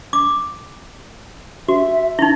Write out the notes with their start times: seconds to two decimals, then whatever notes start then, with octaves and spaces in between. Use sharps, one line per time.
0.13 D6
1.68 F#4 E5
2.19 D#4 E4